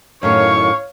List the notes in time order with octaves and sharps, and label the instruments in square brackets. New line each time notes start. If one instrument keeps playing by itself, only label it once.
[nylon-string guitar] F#2 A2 D#3 [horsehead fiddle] C#5 F5 [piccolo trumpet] C#6